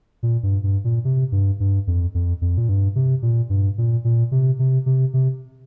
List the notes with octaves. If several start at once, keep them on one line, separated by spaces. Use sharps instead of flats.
A#2
G2
G2
A#2
C3
G2
G2
F2
F2
F2
A#2
G2
C3
A#2
G2
A#2
A#2
C3
C3
C3
C3